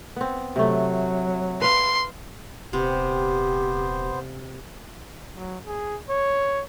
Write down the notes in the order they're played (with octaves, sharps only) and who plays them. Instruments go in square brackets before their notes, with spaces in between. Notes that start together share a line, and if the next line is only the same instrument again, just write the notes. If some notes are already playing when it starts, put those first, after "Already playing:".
[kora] B3 C4
[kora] C3 A3 [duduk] F#3
[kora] B4 F5 [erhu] C6
[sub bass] D#1 [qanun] C3 [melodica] B3 C5 [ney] G4
[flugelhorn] F#3
G#4
C#5